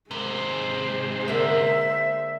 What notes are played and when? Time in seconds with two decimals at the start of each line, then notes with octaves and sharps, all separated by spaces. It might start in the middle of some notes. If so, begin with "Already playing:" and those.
0.11 G#2 C3 G#3 B4 C5
1.28 D3 A#3 E5